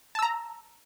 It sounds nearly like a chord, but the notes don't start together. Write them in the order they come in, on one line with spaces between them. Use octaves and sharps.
A5 E6 A#5